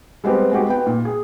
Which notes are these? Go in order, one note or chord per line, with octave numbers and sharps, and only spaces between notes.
G3 G#3 B3 C4 G4
G#3 B3 F#4 G4
B3 G5
A#2
G#4